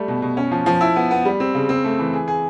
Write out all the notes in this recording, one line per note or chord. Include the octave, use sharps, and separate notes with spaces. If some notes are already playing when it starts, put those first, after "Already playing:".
Already playing: G3 A3
B2
B2
C#4
F3
F3
E4
B3
B3
G3
C4
C#3
C4
A3
E3
G#4
G#4